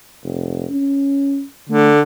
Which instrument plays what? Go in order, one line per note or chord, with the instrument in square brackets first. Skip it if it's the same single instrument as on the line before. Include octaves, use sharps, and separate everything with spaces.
[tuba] F1
C#4
[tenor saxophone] D3 [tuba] A3